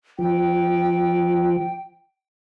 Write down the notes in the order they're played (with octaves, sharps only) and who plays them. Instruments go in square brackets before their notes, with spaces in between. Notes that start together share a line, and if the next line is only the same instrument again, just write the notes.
[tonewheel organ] F3 [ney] G5